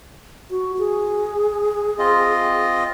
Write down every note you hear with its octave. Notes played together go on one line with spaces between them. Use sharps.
F#4
G#4
C4 F4 D#5